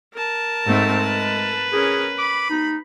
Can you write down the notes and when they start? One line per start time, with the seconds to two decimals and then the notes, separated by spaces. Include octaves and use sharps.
0.14 A#4 A5
0.66 G#2 G#3 A3 C4
1.03 B4
1.73 C#4 G#4 A#4
2.18 B5 D6
2.50 D#4